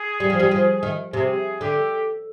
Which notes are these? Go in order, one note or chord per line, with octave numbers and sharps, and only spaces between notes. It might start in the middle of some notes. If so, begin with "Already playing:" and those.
Already playing: G#4
G3
F3
G3
F3
D#3
C3 G#4
D3 G4